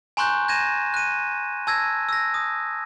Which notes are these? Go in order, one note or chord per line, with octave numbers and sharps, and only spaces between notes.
G#5 A#5 C6 C#6 F#6 G6
G6 G#6 A#6 D#7 E7
F#6 D#7
A5 E6 G#6 A#6
E6 A#6
D#6